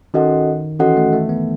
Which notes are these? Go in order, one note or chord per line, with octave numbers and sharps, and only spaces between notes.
D#3 C#4 F#4 A4 D#5 F#5
E3 C#4 F#4 A4 D#5 F#5
A3
A3
B3